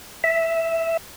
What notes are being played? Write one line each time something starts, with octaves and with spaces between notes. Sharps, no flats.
E5